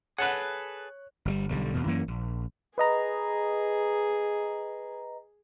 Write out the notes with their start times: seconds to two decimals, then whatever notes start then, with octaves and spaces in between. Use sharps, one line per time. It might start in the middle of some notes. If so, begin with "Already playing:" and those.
0.18 G#4 A4 B4 C#5 F#5 F#6
1.25 G1 D3 G3
1.51 B1 D3 G3
1.74 D#2 B2
1.86 F#2 E3 A#3 C#4
2.08 A#1
2.78 G#4 B4 D#5 A#5